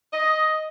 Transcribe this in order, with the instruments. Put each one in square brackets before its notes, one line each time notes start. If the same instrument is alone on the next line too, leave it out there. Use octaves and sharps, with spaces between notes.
[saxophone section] D#5